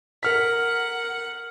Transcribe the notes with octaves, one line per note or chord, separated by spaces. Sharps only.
A#4 F#5 F6 B6